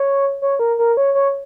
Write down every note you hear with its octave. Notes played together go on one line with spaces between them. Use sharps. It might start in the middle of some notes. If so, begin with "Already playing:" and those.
Already playing: C#5
C#5
A#4
A#4
C#5
C#5